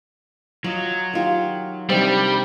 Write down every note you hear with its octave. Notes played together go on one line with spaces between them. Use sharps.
F#3 F4 D#5
D#3 F4 G4
C3 D#3 G3 D4